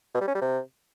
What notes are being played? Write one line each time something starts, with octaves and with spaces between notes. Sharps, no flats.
B2
G3
C#4
G3
C3